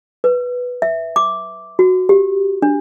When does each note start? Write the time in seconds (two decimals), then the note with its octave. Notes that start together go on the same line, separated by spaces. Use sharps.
0.24 B4
0.82 E5
1.16 D6
1.79 F#4
2.09 G4
2.62 D4